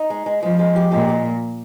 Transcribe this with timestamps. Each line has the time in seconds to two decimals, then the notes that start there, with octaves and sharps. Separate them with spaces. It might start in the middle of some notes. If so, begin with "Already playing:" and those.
Already playing: D#4
0.10 G#3
0.26 G#3
0.43 F3 G#3
0.59 G#3
0.76 G4
0.92 A#2 G#3
1.09 G#3